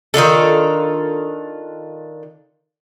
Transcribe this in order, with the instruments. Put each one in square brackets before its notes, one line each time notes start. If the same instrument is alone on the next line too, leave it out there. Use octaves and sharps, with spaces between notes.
[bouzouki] D#3 D4 F4 A4